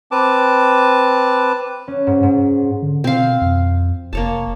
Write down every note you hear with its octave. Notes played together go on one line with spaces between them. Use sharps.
C4 B4 A5 D6
C#4
G#2
G#2
D3
B2 C4 F5
F2
F1 A#3 C#5 A5